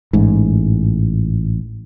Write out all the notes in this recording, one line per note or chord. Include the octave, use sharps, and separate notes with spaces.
A1 G#2